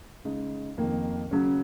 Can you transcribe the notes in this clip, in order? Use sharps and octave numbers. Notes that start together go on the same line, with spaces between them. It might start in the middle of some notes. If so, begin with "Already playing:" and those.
C#3 G#3 D#4
F2 D#3 A#3
C#3 F#3 C#4